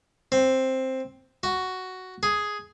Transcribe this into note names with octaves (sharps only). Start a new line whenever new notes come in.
C4
F#4
G#4